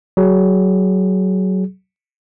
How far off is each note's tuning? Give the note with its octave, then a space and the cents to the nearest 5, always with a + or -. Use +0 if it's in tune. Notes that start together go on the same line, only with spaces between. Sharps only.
F#3 +20 G#4 +10